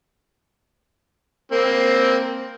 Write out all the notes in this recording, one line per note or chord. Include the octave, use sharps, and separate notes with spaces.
A#3 C4